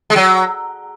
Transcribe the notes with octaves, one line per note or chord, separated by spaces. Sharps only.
G#3
F#3